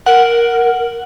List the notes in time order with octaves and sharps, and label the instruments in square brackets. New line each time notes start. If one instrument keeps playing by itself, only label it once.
[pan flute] A#4 [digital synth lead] F#5